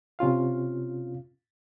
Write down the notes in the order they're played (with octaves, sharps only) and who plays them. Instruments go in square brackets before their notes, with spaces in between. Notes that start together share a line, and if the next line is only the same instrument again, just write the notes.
[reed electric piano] C3 C#4 F4 F5